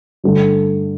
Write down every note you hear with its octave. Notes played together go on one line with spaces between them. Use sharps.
G2 D3 A3